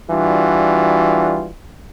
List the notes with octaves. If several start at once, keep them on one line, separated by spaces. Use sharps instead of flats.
E3 G3 D4 F4 F#4